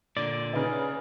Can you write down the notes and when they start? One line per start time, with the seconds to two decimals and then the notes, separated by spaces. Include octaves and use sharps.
0.17 A#2 D3 D5
0.53 C#3 D#4 B4